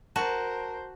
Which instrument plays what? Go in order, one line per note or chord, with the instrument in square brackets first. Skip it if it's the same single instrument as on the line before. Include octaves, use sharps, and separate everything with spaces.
[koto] F#4 [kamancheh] A#4 [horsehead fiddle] C5 [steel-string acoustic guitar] A5